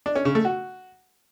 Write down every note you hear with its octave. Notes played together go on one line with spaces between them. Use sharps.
D4
C#4
C#3
A3
F#4